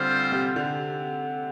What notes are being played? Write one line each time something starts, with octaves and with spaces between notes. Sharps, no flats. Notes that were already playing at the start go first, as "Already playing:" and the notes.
Already playing: D3 G3 C4 F4 C5
C3
D3